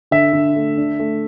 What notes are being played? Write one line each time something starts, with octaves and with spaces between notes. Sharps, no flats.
D3 E5
D3
A3
D4
A3